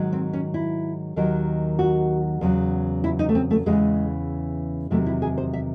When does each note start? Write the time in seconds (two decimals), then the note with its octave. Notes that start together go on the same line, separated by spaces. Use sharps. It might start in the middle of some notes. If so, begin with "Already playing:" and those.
Already playing: G#2 D#3 F#3
0.12 C4
0.33 C#4
0.54 E4
1.16 D#2 D#3 F#3
1.79 F#4
2.41 E2 C#3 F#3
3.04 E4
3.19 D#4
3.29 A3
3.35 C4
3.51 A3
3.66 E2 C#3 E3 G#3
4.90 E2 C3 D#3 F#3 A3
5.06 E4
5.22 G#4
5.38 C5
5.53 E5